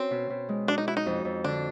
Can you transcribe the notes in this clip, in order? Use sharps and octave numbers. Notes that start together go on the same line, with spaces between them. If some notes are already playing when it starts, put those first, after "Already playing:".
Already playing: C4 C#4 F#4
B2
B2
G#3
D4 F#4
D#4
E4 F#4
D#4
F2
F2
D3 D4